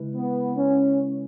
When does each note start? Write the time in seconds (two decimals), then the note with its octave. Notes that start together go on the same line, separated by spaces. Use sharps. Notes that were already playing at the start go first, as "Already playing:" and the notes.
Already playing: C#3 G#3 E4 B4
0.15 B3
0.56 C#4